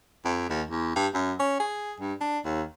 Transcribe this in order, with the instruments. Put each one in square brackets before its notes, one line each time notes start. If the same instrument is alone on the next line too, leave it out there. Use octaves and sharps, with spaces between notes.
[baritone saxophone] F2
D#2
E2
G2
F#2
C#4
G#4
G2
D4
D#2